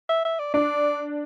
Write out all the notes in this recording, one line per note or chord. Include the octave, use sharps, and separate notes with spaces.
E5
E5
D5
D4 D5